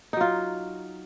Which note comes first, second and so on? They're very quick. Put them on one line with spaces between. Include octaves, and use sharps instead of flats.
D#4 F#3 F4